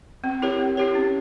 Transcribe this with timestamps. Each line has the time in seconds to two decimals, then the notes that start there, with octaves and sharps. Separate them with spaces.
0.24 C4
0.42 E4 G4 A#4 C#5
0.60 C4
0.77 E4 G4 A#4 C#5
0.95 C#4